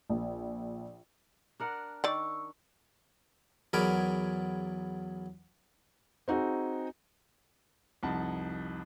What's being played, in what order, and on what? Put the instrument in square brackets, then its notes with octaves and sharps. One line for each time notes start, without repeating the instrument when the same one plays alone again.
[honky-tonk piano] A#1
[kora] D4 A#4 F#5
[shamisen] D#3 D5 [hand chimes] C#6 E6
[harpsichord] E2 F#3 G#4 A#4 D5 B5
[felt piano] C4 D#4 F#4 G#4
[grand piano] C2 F2 D#4 F#5 A5